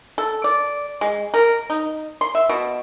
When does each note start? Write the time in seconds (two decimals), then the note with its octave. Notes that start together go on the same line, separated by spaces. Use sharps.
0.18 A4
0.44 D5
1.01 G#3
1.34 A#4
1.70 D#4
2.21 C6
2.35 E5
2.49 B2